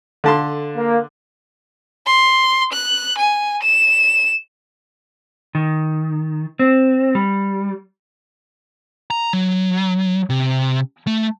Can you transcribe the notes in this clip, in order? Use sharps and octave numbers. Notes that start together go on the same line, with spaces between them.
D3 A4 F5 A5 C6
A#3
C6
F#6
G#5
E7
D#3
C4
G3
A#5
F#3
C3
A3